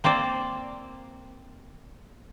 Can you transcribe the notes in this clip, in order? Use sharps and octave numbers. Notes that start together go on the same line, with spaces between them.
A#3 C4 C5 D5